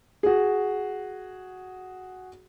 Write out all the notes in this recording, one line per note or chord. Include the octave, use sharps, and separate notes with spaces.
F#4 G#4